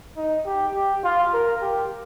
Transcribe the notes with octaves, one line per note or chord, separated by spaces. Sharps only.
D#4
G4
G4
F4
A#4
G4